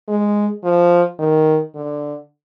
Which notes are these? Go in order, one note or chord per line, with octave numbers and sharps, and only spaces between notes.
G#3
F3
D#3
D3